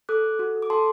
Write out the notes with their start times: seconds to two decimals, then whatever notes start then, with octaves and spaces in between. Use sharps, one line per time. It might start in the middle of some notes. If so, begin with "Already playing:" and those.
0.09 A4 D6 F#6
0.24 A4
0.39 F#4
0.55 A4
0.62 D6
0.70 A4 A5 C6